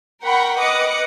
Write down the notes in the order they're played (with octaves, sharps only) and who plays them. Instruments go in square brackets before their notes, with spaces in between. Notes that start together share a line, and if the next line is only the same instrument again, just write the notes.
[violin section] A#4 F#5 G5 B5 C#6
B4 D#5 D6 D#6 F#6 C#7